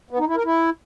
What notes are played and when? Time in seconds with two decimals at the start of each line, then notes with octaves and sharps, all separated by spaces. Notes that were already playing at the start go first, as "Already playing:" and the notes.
0.10 B3
0.19 D#4
0.28 E4
0.36 A#4
0.45 E4